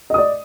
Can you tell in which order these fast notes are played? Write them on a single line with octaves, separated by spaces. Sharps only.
D#5 D#6 D5